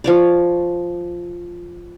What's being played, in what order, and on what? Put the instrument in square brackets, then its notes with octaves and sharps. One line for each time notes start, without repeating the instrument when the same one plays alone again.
[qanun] F3 C#5 D5